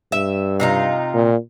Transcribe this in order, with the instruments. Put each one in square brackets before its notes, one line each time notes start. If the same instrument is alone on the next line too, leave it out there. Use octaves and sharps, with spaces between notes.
[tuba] G2 [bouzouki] E5
[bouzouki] C3 D#4 F4
[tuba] A#2